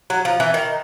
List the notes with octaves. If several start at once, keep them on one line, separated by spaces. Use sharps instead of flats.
F#3
F3
E3
D#3